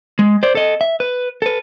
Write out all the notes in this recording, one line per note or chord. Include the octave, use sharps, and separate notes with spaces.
G#3
C5 D5
A4 D#5
E5
B4
A4 B4